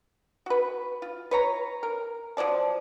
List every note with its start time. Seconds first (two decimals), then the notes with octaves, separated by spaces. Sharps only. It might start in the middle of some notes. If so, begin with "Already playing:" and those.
0.46 F#4 B4
1.02 F4
1.31 B4 C#5 A#5
1.83 A#4
2.37 F3 F#3 D5 A5